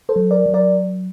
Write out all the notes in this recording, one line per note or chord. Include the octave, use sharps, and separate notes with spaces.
A4 C5
F#3
A#4 D5
F#3
A#4 D5